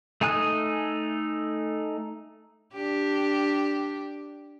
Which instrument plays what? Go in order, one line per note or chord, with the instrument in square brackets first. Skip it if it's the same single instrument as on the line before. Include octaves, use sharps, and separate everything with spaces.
[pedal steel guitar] A3 D#4 G#5 D#6 F#6
[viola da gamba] D4 G4